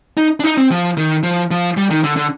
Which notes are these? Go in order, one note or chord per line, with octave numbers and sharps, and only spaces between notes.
D#4
D4
D#4
C4
F3
D#3
F3
F3
G3
D#3
D3
D3